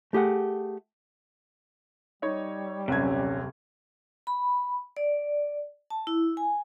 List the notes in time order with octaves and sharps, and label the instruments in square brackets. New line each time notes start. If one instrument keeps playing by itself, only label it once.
[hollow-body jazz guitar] A3 G4 G#4 F#5
[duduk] G3 [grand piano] D#4 C#5
[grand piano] D#1 F#2 G#6 [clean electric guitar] C3 [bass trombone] C#4
[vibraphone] B5
D5
A5
E4
G#5